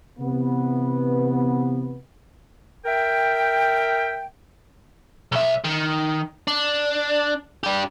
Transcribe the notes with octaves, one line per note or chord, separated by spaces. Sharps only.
C3 E3 B3
A#4 E5 G5
B1 E5
D#3
D4
D4 G4